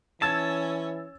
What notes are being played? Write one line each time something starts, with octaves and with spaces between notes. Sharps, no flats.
E3 C#4 C#5 A5 E6 G#6 A6